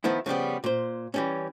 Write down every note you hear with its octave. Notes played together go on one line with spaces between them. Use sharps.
D#3 F3 B3 E4
C#3 F3 G3 B3
A#2 C5
E3 G3 C#4